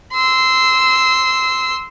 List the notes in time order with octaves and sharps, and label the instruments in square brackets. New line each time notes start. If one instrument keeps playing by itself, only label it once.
[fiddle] C6 E6